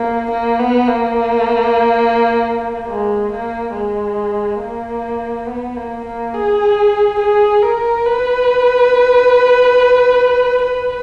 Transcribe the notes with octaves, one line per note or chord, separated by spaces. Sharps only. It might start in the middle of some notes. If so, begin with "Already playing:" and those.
Already playing: A#3
A#3
B3
A#3
G#3
A#3
G#3
A#3
B3
A#3
A#3
G#4
G#4
A#4
B4
B4